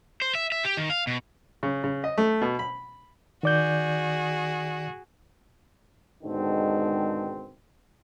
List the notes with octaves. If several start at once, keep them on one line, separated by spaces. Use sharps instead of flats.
C5
E5
E5
G4
D#3
F5
B2
C#3
C#3
D#5
A3
B2
B5
D#3 F#4 G#4 D5 G6
G#2 B2 D3 D#3 G#3 C4